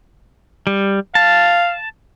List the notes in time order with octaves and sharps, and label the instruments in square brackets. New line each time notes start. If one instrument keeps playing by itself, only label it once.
[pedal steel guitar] G3
[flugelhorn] F5 [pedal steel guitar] A5